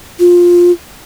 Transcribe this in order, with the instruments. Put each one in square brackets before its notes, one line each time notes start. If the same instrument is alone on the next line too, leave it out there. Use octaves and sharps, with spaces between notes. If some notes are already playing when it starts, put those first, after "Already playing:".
[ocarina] F4